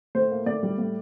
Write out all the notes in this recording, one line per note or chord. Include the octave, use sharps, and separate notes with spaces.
A2 C5
A#3
A2 D5
G3
A2